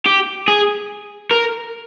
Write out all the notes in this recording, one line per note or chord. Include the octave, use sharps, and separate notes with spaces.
G4
G#4
A#4